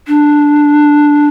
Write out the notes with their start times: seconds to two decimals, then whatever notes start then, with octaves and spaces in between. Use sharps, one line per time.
0.08 D4